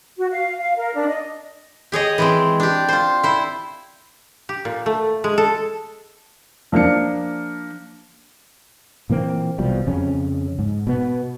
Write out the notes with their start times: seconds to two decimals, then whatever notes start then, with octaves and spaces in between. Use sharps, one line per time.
0.18 F#4
0.32 F5
0.59 F5
0.77 A#4
0.94 D4
1.07 D#5
1.92 G4 G#4 C#5 D#5
2.18 E3 G#3 C4
2.60 D4 G4
2.89 F4 C5
3.23 E4 C5
4.49 G4
4.65 A#2
4.86 A3
5.24 G#3
5.38 A4
6.72 F3 A#3 D4 C#7
9.10 A#2 E3 A#3 C4
9.58 C2 B2 F3 G3
9.87 F2 C#3 C#4
10.59 G#2
10.87 B2 B3